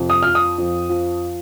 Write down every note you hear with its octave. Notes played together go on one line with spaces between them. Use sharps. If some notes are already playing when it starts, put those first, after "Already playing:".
Already playing: F2 C3
D#6
F3 F6
D#6
F2
F3